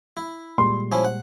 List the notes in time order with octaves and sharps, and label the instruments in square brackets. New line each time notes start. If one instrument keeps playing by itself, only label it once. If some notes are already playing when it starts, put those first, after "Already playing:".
[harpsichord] E4
[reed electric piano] A#2 G3 G#3 [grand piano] C6
[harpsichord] F3 C#4 E4
F#5